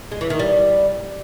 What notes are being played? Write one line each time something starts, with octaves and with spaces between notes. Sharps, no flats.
G#3
E3
D#3
G3